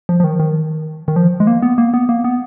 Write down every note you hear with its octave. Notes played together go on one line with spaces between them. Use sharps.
F3
F3
D#3
D#3
D#3
F3
G#3
A#3
B3
A#3
B3
A#3
B3